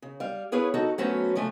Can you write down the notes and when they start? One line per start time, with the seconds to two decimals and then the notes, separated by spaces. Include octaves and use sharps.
0.02 C#3
0.20 G3 F5
0.52 B3 E4 G#4 B4 C#5 F5
0.74 D#4 F#4 A4
0.98 F#3 A3 B3 C#4 F#4 C5
1.35 C3 F3 A3 G#5